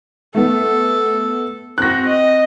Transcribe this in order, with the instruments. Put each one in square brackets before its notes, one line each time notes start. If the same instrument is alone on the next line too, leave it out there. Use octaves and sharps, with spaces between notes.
[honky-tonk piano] A3 B3 [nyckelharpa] A4
[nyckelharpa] C4 F#4 [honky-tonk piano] F#6 A#6
[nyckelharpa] D#5